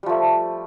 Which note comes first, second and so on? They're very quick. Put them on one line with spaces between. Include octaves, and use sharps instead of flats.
G3 F3 A3